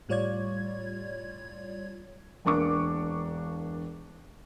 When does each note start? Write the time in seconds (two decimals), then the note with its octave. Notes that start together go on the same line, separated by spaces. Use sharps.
0.09 A2 G3 F4 C#5 D5 G#6
2.45 E1 A#3 D4 C#6 D6